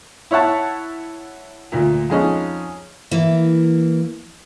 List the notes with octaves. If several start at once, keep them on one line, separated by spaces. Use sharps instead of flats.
E4 C#5 E5 F#5 A5
D2 A#2
F2 G#3 C#4 D#4
E3 A#3